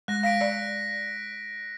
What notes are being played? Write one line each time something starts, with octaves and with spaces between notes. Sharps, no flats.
G#3 F#6 A#6
F5 A#6 B6 D7
D5